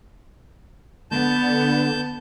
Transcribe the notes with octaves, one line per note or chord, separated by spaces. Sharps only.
D3 B3 A5 G6